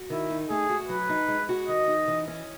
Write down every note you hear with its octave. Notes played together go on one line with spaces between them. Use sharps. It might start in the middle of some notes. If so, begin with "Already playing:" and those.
Already playing: F#4
D#3 E4
D#4
A3 G#4
F#4
F#3 B4
D#4
G#3
F#4
D#3 D#5
D#4
E3
C#4